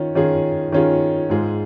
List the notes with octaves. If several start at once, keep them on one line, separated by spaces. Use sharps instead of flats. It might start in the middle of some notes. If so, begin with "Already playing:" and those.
Already playing: D#3 C#4 F4
D#3 C#4 F4 G#4
D#3 C#4 F4 G#4
G#2 G#3 F4 G#4